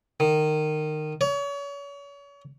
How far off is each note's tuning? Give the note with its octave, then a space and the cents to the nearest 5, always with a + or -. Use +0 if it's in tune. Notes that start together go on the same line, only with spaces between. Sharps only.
D#3 -20
C#5 +35